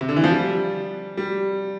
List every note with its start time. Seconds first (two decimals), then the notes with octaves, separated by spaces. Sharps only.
0.01 C3
0.09 D3
0.16 E3
0.24 F3
0.31 G3
1.17 G3